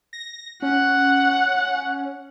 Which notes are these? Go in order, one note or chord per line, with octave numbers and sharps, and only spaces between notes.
A#6
C#4 F#5